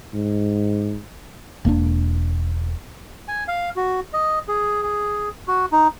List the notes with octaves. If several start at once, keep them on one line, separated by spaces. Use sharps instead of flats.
G#2
E1 A#3 B3 D4
G#5
F5
F#4
D#5
G#4
G#4
F#4
D#4